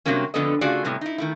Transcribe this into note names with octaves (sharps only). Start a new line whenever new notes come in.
C3 E3 F#3 G3 A#3 C#4
F2 D3 B3 A4 B4 D#5
C#3 A3 F4 F#4 G#4 D5
A2 C3 G3 B3
D#4 E4
D#3 A3 E4